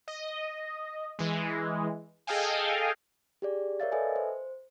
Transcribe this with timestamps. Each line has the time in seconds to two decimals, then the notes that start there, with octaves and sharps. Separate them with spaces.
0.08 D#5
1.19 E3 G#3
2.27 G#4 A4 D#5 F5 G5 G#5
3.42 G4 G#4 D5
3.80 A#4 C#5 D5 E5 F5 A6
3.92 A4 B4 D#5 E5 G#5
4.16 C5